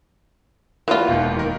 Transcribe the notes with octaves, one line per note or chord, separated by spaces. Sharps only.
E3 A#3 F4 F#4 B4
E1 D#2
D#3 A#4